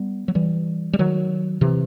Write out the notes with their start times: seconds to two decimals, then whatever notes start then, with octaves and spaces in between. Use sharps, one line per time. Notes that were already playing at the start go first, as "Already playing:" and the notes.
Already playing: G3 B3
0.28 F#3
0.35 E3 G3
0.93 G3
0.99 D#3 F#3
1.61 C3 E3